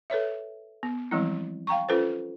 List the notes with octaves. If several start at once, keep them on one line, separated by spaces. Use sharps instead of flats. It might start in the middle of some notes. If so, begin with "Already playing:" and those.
A4 B4 C#5 E5
B3
E3 F3 G3 G#3 C4 E4
F5 G5 A#5 C#6
C#4 F4 A4 B4 C5